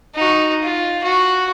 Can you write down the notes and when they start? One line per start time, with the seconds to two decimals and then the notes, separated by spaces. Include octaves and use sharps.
0.15 D#4 F#4
0.62 F4
1.03 F#4